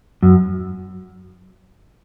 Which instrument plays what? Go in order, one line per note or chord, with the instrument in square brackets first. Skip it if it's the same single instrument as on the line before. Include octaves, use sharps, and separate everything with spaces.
[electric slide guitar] F#2